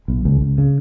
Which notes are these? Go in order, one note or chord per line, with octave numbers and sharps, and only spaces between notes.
B1
C#2
C#2
C#3